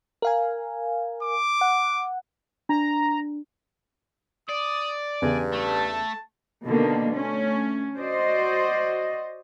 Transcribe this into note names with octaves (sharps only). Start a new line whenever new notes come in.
A#4 F5 G#5
D6
F#5
D4 A#5
D5 D#6
E2 G2 C#3 G#5
A3 A5
B2 D3 D#3 A#3
A3 C#4
F#4 C5 D5 D#5